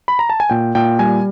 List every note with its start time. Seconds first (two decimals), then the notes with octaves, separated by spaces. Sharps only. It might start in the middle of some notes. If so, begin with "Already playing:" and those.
0.08 B5
0.19 A#5
0.30 A5
0.40 G#5
0.50 A#2 G5
0.75 A#2 G5
0.99 G3 G#5